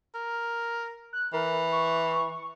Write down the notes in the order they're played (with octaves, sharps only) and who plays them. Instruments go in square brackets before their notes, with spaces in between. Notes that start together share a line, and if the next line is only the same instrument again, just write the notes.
[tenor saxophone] A#4
[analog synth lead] F#6
[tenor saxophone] E3 [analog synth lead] A#4
[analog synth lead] C#6